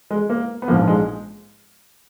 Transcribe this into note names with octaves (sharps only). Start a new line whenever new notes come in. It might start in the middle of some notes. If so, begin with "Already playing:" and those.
G#3
A#3
B3
A#1 G#2 F3 A#3
G#3